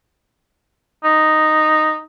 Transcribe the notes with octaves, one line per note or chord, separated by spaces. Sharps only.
D#4